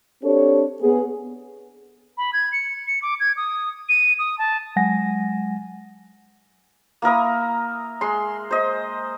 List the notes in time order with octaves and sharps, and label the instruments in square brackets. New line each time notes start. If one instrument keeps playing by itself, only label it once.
[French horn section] C4 D4 G4 A4 C#5
B3 G#4
[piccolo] B5
G#6
C#7
C#7
D6
G#6
D#6
D#7
D#6
A5
[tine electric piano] F#3 G#3 F#5 G#5 A#6
[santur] A#3 E4 A#4 D#6
G#3 C6
C5 D#5